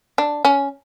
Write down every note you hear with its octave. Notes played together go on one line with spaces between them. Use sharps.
D4
C#4